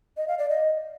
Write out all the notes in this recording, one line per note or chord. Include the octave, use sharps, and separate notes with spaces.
D#5
F5
D5
D#5